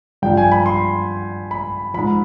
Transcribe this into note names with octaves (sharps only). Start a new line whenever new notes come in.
G2 F3 G5
G#5
B5
C6
B5
G#2 F3 B5